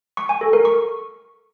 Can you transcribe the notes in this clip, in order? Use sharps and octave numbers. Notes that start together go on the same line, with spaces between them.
C#6
G#5
A4
A#4
C#6